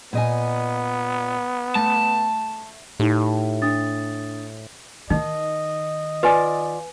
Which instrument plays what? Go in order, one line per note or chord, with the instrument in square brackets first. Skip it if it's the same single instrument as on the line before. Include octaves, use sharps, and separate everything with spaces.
[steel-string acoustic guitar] A#2 D#5 G#5 [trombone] B3
[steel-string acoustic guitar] A3 [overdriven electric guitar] A5
[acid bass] A2 [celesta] D#4 G4
[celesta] D4 D#6 A6
[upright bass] D#3 [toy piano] D#4 [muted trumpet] D#5
[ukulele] F4 D5 [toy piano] B4 G#5